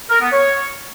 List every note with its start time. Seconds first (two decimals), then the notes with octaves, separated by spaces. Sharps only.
0.09 A#4
0.21 B3
0.32 C#5